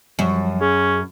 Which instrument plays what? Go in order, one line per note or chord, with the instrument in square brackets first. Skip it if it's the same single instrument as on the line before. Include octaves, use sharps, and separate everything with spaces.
[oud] F#2 [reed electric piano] F3 G3
[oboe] C#4 [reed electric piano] G#4